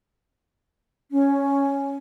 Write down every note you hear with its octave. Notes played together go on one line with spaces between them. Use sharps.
C#4